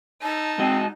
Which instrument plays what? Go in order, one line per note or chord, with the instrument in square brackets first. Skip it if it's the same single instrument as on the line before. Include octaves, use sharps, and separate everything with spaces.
[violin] D#4 [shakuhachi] A5
[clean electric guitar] G#3 F#4 D#5 [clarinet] C4